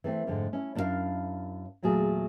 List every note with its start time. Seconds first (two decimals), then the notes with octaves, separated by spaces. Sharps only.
0.04 E3 A3 C4
0.27 F2 G#2 D3
0.53 C#4 E4
0.75 F#2 D4 E4 F4 A#4 F5
1.83 E2 A#2 F#3 A3 G#4